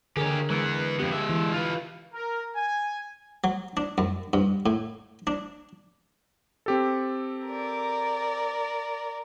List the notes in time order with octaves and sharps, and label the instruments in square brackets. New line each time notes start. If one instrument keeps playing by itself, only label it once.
[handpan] D3 G#4 A#4 [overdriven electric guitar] G4 C#5
[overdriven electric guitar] E3 B3 [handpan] G#3
[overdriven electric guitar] F2 B3 [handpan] G4
[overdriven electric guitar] G#3 E5
[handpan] E3
[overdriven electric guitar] F4 B4
[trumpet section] A#4
G#5
[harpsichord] F#3
D4
F#2
G2
A2
D4
[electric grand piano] C4 G4 A4
[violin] A#4 D5